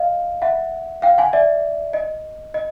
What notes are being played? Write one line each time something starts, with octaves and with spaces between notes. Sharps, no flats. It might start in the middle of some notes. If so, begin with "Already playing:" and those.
Already playing: D#5 F5
E5 F#5
F5 G5
F#5 G#5
D5 E5
D#5
D#5